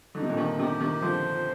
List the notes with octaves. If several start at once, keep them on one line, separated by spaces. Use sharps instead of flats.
D3 D#4
C3
A#2 D3
C3 D#3
C3 D#3 G4
C3 D#3
D3 F3 C5